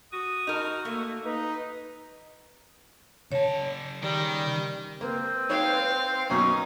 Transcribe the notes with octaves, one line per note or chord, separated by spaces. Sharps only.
F#4 D#6
D#4 A#4
A3 A#3
D#4 B4
C#3 C#5 A5
D#3 G3
A#3 C4 B4
D#4 C#5 F5 G5
F#2 B2 C#4 D#4 C#6